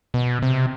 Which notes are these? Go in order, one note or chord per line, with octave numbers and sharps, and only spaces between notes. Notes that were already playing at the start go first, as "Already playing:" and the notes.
B2
C3